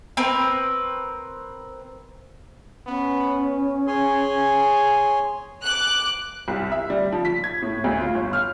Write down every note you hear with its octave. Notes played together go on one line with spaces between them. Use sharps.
C4 A#4 B4
B3 C#4
G#4 C#5 G#5 C6
D6 F#6
C2
E5
G3
F3
B6
G#6
A2
D2
F4
G1
F6